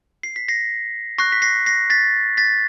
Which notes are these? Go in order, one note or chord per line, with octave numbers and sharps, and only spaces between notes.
C7
B6
A#6 C7
C#6 F#6 A#6 C7
B6
A#6 C7
A#6 C7
A6 B6
A6 B6